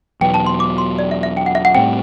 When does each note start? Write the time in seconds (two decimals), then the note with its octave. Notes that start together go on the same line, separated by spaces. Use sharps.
0.21 E2 B2 F#3 B3 G5
0.34 A5
0.47 C6
0.60 D6
0.78 C6
0.99 D5
1.11 E5
1.23 E5
1.37 G5
1.46 F#5
1.55 E5
1.65 F#5
1.75 A2 G3 C4 G5